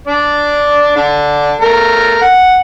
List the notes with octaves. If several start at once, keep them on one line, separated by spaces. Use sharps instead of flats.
D4 D5
D3 D4
A3 A#4
F#5